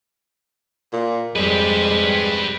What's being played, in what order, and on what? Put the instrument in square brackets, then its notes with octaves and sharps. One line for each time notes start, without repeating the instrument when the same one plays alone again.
[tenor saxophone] A#2
[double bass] F2 G3 [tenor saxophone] G#3 [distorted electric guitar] G4 B4